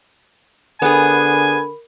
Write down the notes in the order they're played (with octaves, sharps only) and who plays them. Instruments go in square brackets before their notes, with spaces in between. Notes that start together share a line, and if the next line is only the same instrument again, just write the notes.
[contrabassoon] D3 [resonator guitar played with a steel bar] B3 G#4 [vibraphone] A#4 B5 [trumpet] G#5